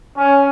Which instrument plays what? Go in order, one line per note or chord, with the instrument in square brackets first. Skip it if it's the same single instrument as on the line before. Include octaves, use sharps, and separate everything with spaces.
[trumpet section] C#4